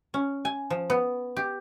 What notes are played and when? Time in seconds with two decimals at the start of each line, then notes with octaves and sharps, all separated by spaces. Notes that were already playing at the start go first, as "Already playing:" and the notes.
0.14 C#4
0.45 G#5
0.70 F3
0.90 B3
1.37 G4